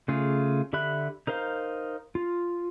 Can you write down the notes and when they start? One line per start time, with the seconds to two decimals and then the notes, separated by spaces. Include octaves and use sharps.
0.08 C#3 A3 F4 G#4
0.73 D3 G4 E5 B5 F#6
1.27 D#4 A#4 C5 F5
2.15 F4